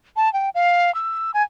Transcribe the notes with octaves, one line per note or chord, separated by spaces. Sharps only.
A5
G5
F5
E6
G#5